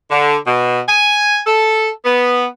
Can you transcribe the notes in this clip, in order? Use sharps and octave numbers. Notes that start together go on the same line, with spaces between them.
D3
B2
G#5
A4
B3